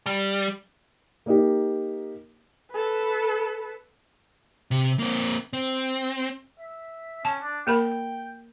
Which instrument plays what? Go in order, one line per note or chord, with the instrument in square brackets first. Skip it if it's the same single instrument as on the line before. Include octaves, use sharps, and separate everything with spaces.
[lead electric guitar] G3
[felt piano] A#3 D#4 G4
[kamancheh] A4 B4
[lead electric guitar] C3
A#3 C4
C4
[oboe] E5
[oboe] C#4 [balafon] A5
[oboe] D4
[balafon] A#3 A#4 B5 [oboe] G5